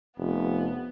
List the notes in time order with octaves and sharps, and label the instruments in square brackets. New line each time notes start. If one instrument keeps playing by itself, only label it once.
[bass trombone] F1 [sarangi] B3